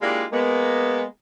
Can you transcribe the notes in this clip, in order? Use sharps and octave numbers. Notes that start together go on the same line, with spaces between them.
G#3 A#3 D4 E4 F4 G4
G#3 A#3 B3